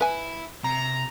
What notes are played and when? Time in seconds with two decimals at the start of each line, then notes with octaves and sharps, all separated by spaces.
0.01 E4 B4 G#5
0.64 C3 A#5